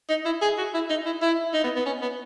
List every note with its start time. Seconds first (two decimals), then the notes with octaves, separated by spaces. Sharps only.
0.09 D#4
0.25 E4
0.42 G#4
0.58 F#4
0.74 E4
0.90 D#4
1.06 E4
1.22 E4
1.54 D#4
1.64 B3
1.76 B3
1.86 C#4
2.02 B3